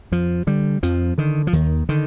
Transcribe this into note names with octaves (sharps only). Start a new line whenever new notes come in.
F2 F3
D3 G3
F2 F3
D3 D#3
F3
D#2 D#3
D3 D#3